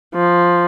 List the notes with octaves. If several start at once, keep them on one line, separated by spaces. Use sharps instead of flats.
F3